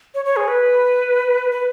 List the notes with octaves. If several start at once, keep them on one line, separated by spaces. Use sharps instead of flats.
C#5
C#5
G#4
B4
B4